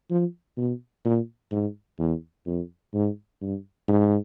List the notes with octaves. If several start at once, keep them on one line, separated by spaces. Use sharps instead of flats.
F3
B2
A#2
G#2
E2
F2
G#2
G2
G#2